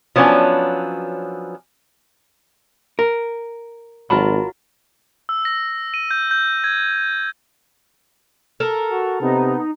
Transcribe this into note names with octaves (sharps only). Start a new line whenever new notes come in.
F3 F#3 B3 C#4 D4
A#4
G#1 F#3 F4 A#4 A5 B5
E6
A#6
D#7
G6
G6
G#6
A4 A#4
F#4
C3 B3 D#4